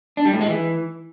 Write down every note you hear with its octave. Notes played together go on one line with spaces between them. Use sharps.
D4
G3
A2
G#3
E3